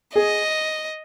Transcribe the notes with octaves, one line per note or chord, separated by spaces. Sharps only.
G#4 D#5